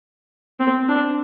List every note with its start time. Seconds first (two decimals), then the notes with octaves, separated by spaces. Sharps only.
0.60 C4
0.88 D4